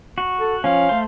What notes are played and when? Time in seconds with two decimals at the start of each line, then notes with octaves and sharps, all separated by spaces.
0.18 F#4
0.40 A4
0.64 F3 C#4 F5
0.89 A3 C5